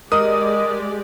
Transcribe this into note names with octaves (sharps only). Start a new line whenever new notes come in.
G#3 G4 A#4 D5 D#5 D#6